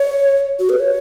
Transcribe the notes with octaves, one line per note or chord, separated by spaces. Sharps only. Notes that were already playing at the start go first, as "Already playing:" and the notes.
Already playing: C#5
F#4
B4
C#5